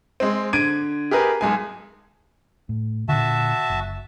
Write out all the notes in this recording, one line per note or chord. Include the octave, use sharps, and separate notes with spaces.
G#3 C4
D3 G#6 D7 D#7
G4 G#4 A#4 B4
B1 G#3 G#5
A2
A#2 D3 F#4 E5 A5
F#1